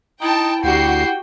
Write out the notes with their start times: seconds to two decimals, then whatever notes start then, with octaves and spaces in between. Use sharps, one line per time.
0.21 D#4 E4 G5 A5
0.64 D2 F#4 G4 G5 C7